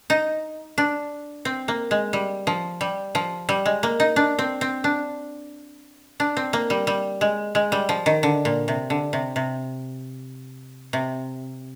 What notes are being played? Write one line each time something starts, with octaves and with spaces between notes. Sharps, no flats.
D#4
D4
C4
A#3
G#3
G3
F3
G3
F3
G3
G#3
A#3
D#4
D4
C4
C4
D4
D4
C4
A#3
G3
G3
G#3
G#3
G3
F3
D#3
D3
A#2
C3
D3
C3
C3
C3